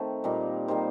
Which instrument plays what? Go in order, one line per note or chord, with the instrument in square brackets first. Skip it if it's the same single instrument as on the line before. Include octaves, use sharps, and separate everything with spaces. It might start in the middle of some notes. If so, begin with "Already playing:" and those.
Already playing: [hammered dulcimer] D#3 A3 C4
A#2 G3 A#3 D#4
D#3 G3 A#3 C5